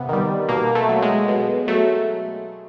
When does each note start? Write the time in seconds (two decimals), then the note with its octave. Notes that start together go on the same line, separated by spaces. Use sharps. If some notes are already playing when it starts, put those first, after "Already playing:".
Already playing: C3 B3
0.09 D#3 G3
0.49 B2 A#3
0.75 A3
0.89 F#3
1.02 G#3
1.28 B2
1.68 F#3 A3